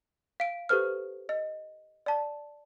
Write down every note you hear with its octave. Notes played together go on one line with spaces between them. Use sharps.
F5 D7
G4 A4 B4 C5 F6
D#5
D5 A5